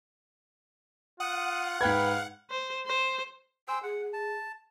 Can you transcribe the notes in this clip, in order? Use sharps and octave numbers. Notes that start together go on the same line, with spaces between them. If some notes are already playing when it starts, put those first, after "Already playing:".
F4 F#5 D#6
G#2 B4 F5 G5 G#6
C5
C5
C5 G5 G#5 E6
G#4 F#5
A5